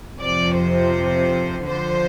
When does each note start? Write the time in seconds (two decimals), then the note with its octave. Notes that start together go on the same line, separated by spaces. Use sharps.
0.20 F2 C3 F3 D5
0.57 C5
1.66 F2 D3 F3 C5